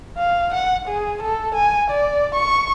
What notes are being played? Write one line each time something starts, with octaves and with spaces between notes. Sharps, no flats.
F5
F#5
G#4
A4
G#5
D5
C#6